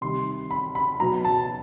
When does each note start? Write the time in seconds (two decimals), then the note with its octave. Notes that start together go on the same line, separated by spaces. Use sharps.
0.01 C3 D#3 G3 C6
0.51 B5
0.75 B5
1.00 B2 F#3 A#5
1.25 A5